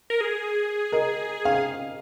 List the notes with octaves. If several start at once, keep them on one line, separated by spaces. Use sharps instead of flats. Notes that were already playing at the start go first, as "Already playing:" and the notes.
A#4
G#4
A#4 D#5
F5